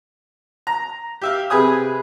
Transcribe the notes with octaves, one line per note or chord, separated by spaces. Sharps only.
A#5
G4 E5 F5
C3 G#4 B4 G#5 D#6